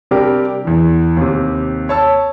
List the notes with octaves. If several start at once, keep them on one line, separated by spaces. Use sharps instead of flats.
C3 G3 D4 G4 A#4
E2 E3
D#2 C3
C#5 A5 E6